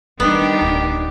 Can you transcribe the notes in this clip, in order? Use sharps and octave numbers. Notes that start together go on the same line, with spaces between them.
D#3 G3 A3 B3 D4 G4
D1